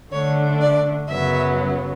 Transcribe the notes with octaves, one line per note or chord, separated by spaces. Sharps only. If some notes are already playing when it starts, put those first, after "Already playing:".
D3 A3 D4 C#5
D5
F#2 C#3 F#3 B3 E5